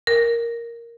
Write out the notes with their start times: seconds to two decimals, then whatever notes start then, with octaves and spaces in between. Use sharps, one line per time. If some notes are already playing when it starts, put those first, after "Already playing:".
0.07 A#4